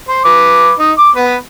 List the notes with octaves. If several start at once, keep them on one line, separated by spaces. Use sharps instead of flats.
C5
B4 D6
D#4
D6
B3 B4